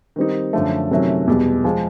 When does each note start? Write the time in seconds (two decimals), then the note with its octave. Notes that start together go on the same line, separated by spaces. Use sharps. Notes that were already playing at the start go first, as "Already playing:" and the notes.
0.16 D#3 G3 C4 D#4
0.53 F#2 D3 F3 A3
0.91 C3 D#3 F#3 A3 C#4
1.28 E2 B2 G3
1.64 F3 G#3